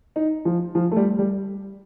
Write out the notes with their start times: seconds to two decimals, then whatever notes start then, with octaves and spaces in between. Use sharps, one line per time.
0.16 D#4
0.45 F3
0.75 F3
0.91 A3
0.96 G3
1.19 G3